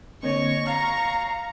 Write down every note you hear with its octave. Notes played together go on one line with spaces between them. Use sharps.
D3 A#3 C4 C#5 D#5 C#6
F5 A#5 F6